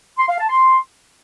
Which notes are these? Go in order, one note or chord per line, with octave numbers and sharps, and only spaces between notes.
C6
F5
A5
C6